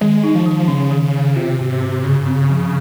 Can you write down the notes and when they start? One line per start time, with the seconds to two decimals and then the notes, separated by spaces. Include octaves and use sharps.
0.01 D#3 G#3
0.24 D#4
0.35 F3
0.46 D#3
0.68 C#3 C#4
0.91 D#3
1.02 C#3
1.14 D#3
1.36 C3 F4
1.59 G#2
1.81 G#2
2.04 G2 C#3
2.27 C4
2.49 F3